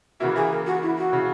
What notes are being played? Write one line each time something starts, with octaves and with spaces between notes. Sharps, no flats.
C#3 E3 A#3 E4 F#4
G#4
A#4
F#4
E4
F#4
C#3